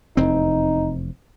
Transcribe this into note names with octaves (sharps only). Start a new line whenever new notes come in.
F1 E2 C4 D#4